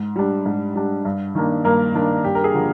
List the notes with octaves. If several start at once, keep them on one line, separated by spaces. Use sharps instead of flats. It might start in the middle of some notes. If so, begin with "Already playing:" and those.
Already playing: G#2
G3 D4
G#2
G3 D4
G2
D#3 A#3 D4
G2 A#3 A#4
D#3 A#3 D4
G2 G4
A#4
G#4
D3 F3 A#3